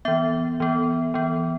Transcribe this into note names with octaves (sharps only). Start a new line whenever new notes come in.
E3 B3 E5
E3 B3
E3 B3